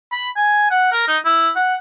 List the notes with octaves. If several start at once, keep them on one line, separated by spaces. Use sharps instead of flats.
B5
G#5
F#5
A#4
D#4
E4
F#5